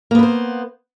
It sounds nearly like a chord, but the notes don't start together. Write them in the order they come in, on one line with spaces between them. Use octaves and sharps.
A#3 B3 B4 C5